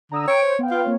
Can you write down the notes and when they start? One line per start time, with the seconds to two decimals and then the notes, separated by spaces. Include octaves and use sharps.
0.12 D3 A#5 D#6 E6
0.27 C#5 G5 D7
0.42 C5
0.59 B3 F5 G5
0.71 F4
0.84 A#3 C4 C#5